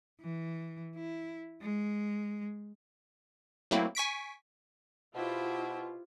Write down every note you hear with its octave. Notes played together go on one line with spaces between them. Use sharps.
E3
E4
G#3
F#3 A3 A#3 C4 E4
G#5 C#6 B6 D7
B2 E4 F4 G4 C5